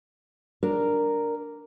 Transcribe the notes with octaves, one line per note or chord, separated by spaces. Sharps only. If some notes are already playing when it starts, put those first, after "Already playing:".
D4 A#4